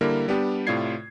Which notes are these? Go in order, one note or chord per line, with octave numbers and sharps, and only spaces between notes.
D3 G3 A#3 E4 A#4
G3 B3 D4 G4
A2 C3 F4 D5 G#6 C7